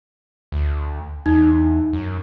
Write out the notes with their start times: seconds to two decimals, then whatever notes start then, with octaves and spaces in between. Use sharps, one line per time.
0.52 D2
1.26 E2 D#4
1.93 F#2